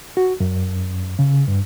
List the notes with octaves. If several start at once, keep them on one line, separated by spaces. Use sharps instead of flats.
F#4
F#2
C#3
G2